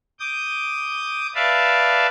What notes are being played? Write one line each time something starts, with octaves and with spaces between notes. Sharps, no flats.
D6 D#6 G6
B4 D5 E5 F5 A5